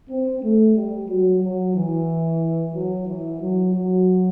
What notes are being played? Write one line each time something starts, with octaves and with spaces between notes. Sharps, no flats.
C4
A3
G3
F#3
F#3
E3
F#3
E3
F#3
F#3